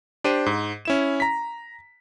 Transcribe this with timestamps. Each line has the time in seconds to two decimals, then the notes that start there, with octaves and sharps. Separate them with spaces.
0.24 D4 G4 C5 D#7
0.46 G#2
0.85 C#4 E4 E7
1.20 A#5 B6